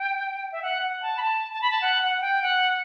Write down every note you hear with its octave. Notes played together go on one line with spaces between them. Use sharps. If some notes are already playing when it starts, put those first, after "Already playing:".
Already playing: G5
E5
F#5
F#5
A5
B5
A5
A5
B5
A5
F#5
F#5
F#5
G5
F#5